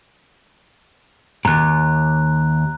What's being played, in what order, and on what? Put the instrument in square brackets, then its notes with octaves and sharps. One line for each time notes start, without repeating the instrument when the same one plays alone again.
[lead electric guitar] D#2 G#2 [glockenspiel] A#5 F#6